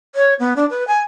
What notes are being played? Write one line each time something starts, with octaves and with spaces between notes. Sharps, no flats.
C#5
B3
D4
B4
G#5